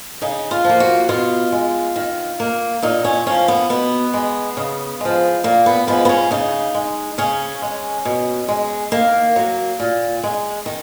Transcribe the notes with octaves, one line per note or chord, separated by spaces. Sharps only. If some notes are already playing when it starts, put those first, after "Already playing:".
C#3 D#4
F4
F3 A#3
F#4
B2 F4
G#3
D#3
A#3
A#2 D#4
C#4
F3 A#3 C#4
B3
B2 B3
G#3
C#3
F3 G#3
A#2 A#3
B3
F3 G#3 B3
B3
C#4
C#3 D#4
G#3
C#3 C#4
G#3
B2
G#3
D#3 A#3
F#3 A#3
A#2
G#3
D#3